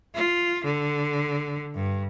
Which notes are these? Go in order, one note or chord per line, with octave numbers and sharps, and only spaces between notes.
F4
D3
G2